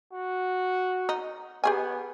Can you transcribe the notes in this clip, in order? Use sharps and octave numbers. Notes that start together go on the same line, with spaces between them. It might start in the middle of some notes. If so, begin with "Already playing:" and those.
F#4
D#4
B3 G4 G#4 G#5